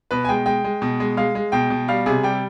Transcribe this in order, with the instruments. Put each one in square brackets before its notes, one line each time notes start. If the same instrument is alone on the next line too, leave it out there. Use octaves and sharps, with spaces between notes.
[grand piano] B2 B4
G#5
G#3 G5
G#3 G5
G#3
B2
G#3
G#3 F5
G#3
B2 G5
B2
G3 F5
C3 G#4
G3 G5